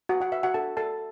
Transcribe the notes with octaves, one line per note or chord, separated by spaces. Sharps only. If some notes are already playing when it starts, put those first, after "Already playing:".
F#4 B4 F#5
F#4 F#5
B4 E5
F#4 F#5
D4 A4 A5
A4 A5